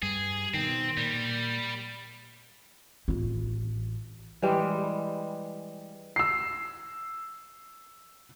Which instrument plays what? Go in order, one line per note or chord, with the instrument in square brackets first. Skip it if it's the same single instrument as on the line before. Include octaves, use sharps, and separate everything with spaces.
[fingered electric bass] G2 G3 [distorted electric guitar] G#4
[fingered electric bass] B2 D#3 [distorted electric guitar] C4
[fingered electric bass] A#2 [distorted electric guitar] G3
[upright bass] A1 F4
[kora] E3 G3 G#3
[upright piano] E6 C7